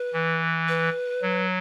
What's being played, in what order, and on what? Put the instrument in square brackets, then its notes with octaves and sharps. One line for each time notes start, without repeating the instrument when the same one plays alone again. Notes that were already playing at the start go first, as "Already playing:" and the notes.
Already playing: [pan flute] B4
[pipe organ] E3
[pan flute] B4
[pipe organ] F#3